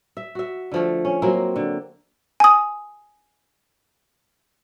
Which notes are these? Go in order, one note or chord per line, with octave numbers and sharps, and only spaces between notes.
E5
F#4 E5
D3 F3 A3
C#4
F#3 A#3 C4 E4
D3
G#5 D#6